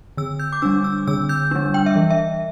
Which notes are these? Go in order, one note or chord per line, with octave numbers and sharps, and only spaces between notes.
D3 E6
G6
D6
G3 D4 E6
E6
D3 E6
G6
G3 D4
G5
E5
E3
E5